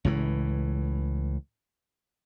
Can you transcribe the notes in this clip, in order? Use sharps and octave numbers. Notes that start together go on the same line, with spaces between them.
C#2 A2 E3